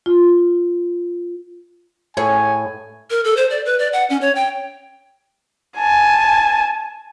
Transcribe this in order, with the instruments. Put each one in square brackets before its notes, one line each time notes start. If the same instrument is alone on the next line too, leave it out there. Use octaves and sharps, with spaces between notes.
[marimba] F4
[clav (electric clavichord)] A2 [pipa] G#4 C#5 [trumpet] G#5
[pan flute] A#4
A4
C5
D5
B4
D5
F#5
C#4
C#5
G5
[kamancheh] G#5 A5